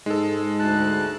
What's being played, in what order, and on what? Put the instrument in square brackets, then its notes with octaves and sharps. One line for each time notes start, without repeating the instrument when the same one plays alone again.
[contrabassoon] G#2 [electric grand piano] G#3 A4
[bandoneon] D2 A5 F#6